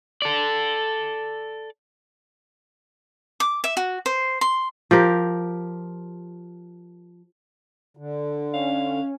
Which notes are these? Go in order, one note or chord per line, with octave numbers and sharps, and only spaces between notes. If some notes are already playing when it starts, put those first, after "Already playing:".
A4 D5
D6
E5
F#4
C5
C6
F3 G4 A#4
D3
C#4 F5